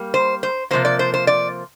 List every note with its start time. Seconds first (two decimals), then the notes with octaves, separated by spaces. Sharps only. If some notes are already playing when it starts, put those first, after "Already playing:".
Already playing: G3 A#3
0.14 C5
0.43 C5
0.71 C3 F3 A#3 C5
0.85 D5
0.99 C5
1.14 C5
1.27 D5